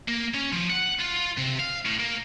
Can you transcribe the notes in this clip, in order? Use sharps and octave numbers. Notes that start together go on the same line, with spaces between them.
A#3
C#4
F3
F#5
F4
C3
F5
A2
A#3